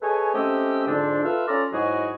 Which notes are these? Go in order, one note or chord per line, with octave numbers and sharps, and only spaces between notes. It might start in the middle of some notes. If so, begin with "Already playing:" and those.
G#4 A4 B4 C#5 D#5 G#5
A3 C4 C#4 G4 D#5 E6
F2 G#2 D3 C4 D4
F4 A4 B4 E5 F5
C#4 F4 A4 D5 A#5
G#2 F#3 E4 F#4 G#4 D#5